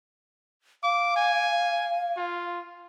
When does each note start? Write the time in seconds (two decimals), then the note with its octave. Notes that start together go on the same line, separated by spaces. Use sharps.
0.83 F5 D6
1.16 G#5
2.17 F4